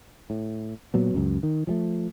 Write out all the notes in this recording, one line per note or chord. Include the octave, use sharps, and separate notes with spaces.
A2
A#2 F#3 B3
C#2 F#2
D#3
F3 G3 A3